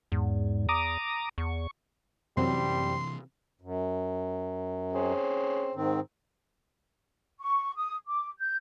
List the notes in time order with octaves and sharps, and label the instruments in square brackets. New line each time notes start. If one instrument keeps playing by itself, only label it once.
[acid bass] E2 [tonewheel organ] G#2
[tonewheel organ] A#5 D6 D#6
[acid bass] E2 [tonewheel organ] C#6
[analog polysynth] F#2 C4 [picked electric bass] C3 E3 [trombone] G3 [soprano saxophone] C6
[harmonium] F#2
[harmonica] C4 C#4 G#4
[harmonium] G#2 D#3 C4
[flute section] C#6
D#6
D6
G6